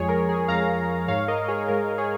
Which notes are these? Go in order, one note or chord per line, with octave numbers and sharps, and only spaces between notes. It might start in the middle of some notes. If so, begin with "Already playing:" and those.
Already playing: F2 F3 G#3 G#4 C#5
A#4
G#4
F2 F3 G#3 F5 A#5
G#2 G#3 C#5 F5
A#4 D#5
G#4 C#5
G#2 G#3 A#4
G#4 C#5